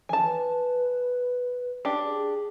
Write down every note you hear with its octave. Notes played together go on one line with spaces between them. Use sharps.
E3 G#5 A5
B4
D4 G4
G#4